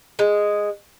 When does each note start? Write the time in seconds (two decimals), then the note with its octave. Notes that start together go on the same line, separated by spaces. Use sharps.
0.19 G#3